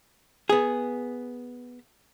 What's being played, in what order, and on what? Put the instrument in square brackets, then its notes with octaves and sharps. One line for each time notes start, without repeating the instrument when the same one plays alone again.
[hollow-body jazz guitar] B3 G#4